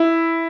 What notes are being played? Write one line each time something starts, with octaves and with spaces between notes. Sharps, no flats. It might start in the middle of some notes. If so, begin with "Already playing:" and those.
Already playing: E4